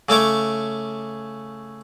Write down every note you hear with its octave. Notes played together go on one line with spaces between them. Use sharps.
C#3 A3 C#5 D6